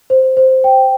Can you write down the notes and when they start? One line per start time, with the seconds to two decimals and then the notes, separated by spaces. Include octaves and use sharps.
0.10 C5
0.37 C5
0.64 G5